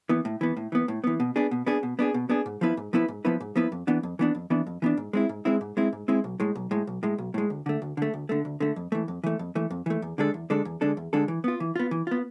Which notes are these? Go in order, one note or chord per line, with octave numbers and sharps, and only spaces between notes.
E3 B3
A2
E3 B3
A2
E3 B3
A2
E3 B3
B2
B3 D4 G#4
B2
B3 D4 G#4
B2
B3 D4 G#4
B2
B3 D4 G#4
G#2
F3 B3 E4 B4
G#2
F3 B3 E4 B4
G#2
F3 B3 E4 B4
G#2
F3 B3 E4 B4
F2
E3 B3 D4
F2
E3 B3 D4
F2
E3 B3 D4
F2
E3 B3 D4
G#2
G#3 C4 E4
G#2
G#3 C4 E4
G#2
G#3 C4 E4
G#2
G#3 C4 E4
B1
A2 G#3
B1
A2 G#3
B1
A2 G#3
B1
A2 G#3
D2
D3 A3
D2
D3 A3
D2
D3 A3
D2
D3 A3
F2
E3 A3
F2
E3 A3
F2
E3 A3
F2
E3 A3
E2
D3 G#3 D4 A4
E2
D3 G#3 D4 A4
E2
D3 G#3 D4 A4
E2
D3 G#3 D4 A4
E3
B3 F4
E3
B3 F4
E3
B3 F4